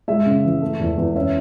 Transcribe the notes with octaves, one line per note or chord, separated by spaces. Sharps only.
G#3 E5
C#3
E3
A3
E2
E2
C#4 E5